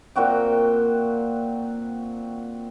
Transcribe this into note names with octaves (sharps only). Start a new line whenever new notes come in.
A#2 C4 F#4 G5